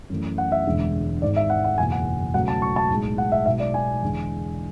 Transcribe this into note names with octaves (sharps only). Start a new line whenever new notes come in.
F#2 E3 A3
F#5
E5
E1 E2 D3 G#3
G#1 G#2 G#3 D5
E5
F#5
F#5
F#1 E2 B2 G#5
F#5
C#2 B2 F#3 A3 F#5
A5
C#6
A5
B1 A2 G#3
F#5
E5
B1 B2 G#3 E5
D5
G#5
E2 D3 G#3